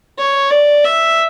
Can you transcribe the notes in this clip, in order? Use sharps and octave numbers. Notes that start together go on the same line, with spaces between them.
C#5
D5
E5